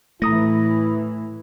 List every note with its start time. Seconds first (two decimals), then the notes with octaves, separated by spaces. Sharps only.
0.22 A2 E3 A3 E4 A#5 D#6 A#6